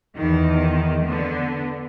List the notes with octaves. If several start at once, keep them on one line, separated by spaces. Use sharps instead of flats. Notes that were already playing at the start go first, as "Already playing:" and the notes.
E2 D#3
D3 B3